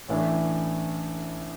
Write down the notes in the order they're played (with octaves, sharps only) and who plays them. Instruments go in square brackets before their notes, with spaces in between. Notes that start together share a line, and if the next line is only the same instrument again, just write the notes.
[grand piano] A1 A2 E3 A3 D4